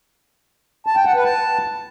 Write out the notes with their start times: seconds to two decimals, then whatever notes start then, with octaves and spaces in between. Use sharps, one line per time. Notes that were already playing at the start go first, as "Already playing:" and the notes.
0.87 A5
0.96 G5
1.05 F#5
1.15 B4
1.24 A5